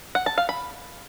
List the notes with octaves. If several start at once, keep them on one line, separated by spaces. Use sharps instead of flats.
F#5
A5
F5
B5